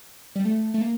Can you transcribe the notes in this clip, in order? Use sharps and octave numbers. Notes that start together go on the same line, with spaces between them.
G3
A3
A3
A#3